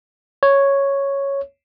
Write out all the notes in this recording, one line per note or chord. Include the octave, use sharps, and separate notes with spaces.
C#5